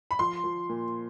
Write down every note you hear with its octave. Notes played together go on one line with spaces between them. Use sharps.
B5
F3 C6
F3
A#2